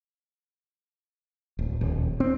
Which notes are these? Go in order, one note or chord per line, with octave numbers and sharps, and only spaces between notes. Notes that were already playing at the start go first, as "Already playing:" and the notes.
D1
D#1
C4